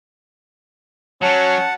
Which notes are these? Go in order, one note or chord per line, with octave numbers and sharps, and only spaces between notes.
F#3 C#4 F#5 A5